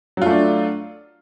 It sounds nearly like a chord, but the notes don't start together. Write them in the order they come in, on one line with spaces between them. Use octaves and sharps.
F#3 F4 A3 D4